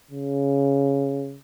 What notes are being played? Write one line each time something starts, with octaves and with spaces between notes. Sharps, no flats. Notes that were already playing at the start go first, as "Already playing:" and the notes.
C#3